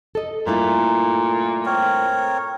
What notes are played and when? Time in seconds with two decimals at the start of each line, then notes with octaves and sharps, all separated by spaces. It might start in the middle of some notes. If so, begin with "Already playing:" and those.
0.15 A4 D#5
0.47 G2 A#2 A3 E4
1.66 C4 A#4 C#5